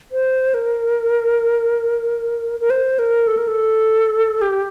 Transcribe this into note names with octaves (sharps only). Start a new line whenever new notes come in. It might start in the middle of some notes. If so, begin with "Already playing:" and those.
C5
A#4
A#4
C5
A#4
A4
A#4
A4
G4